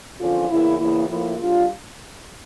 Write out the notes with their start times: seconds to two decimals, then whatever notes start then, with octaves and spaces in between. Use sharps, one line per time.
0.19 E2 D3 F3 C#4 F4
0.49 E2 C#3 E3 A#3 E4
0.79 E2 C#3 E3 A#3 E4
1.08 A2 F3 A#3 E4
1.38 D2 C#3 G3 D4 F4